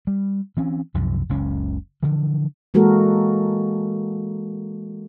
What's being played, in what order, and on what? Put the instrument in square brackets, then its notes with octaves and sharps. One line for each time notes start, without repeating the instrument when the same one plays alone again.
[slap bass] G3
E3 C4 C#4
C2 F#2 C3 F3
F#1 C#2 C#4
D3 E3 F3
[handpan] E3 G#3 A#3 F#4 A4 A#4